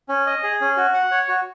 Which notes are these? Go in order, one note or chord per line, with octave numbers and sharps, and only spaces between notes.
C#4
D#5
G#4
C#4
F#4
F#5
C#5
F#4